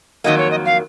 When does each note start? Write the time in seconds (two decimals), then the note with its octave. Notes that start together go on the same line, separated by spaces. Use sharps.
0.24 F2 D#3 F#3 A#3 D#5
0.38 C#5
0.51 D#5
0.65 F5